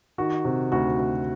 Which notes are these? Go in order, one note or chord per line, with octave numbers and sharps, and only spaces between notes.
D#3 F#4
C3
D2 F#4
D2